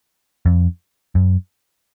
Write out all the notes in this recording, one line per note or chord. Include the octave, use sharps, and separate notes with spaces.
F2
F#2